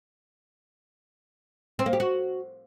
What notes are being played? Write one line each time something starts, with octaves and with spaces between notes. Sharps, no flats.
C4
A#3
G4
F#4